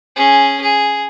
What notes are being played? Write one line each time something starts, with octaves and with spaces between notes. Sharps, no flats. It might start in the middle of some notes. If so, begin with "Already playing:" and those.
C#4 G#4
G#4